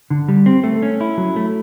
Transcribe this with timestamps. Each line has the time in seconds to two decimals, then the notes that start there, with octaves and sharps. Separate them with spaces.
0.10 D3
0.28 G3
0.46 C4
0.64 A3
0.83 C#4
1.01 E4
1.17 F#3
1.36 A3